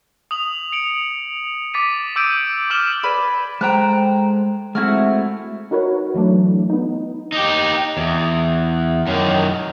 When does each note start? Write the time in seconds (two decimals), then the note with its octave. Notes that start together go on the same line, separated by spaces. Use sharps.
0.31 D#6 F7 F#7
0.72 C#7 D7 F#7
1.74 D6 A6 B6 D#7
2.16 D6 E6 G6 D7 D#7
2.70 D6 F6 D7 E7 F#7
3.03 B4 D5 G#5
3.61 G#3 A4 C5 G5 A#5 F#6
4.75 G#3 A3 C4 E4 F#4 F6
5.71 D#4 F#4 A#4 B4 C#5
6.14 E3 F#3 A3 D4
6.70 B3 D#4
7.32 D#4 G4
7.97 E2
9.07 F#2 D#3